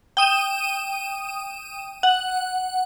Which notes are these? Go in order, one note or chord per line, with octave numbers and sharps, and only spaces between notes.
G5 D#6 D#7 E7
F#5